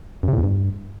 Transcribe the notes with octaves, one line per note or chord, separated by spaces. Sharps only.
F#2
C3
A2
E2
G2